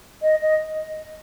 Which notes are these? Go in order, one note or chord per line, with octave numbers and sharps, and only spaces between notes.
D#5
D#5